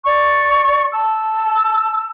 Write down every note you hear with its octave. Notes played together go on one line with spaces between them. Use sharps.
D5 C#6
A5 E6